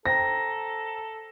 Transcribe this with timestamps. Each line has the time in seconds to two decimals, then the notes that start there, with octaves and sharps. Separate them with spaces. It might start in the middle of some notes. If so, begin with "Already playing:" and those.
0.06 A4 C5 G5 A#5 A#6